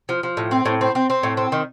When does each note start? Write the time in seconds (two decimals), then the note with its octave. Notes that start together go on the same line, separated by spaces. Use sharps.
0.09 F3
0.23 F3
0.37 A2
0.51 C4
0.65 A2
0.81 C4
0.95 C4
1.10 C4
1.23 A2
1.37 C4
1.52 D#3